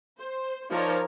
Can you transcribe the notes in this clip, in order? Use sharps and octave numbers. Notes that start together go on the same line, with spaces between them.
C5
F3 D#4 A#4 C#5 D5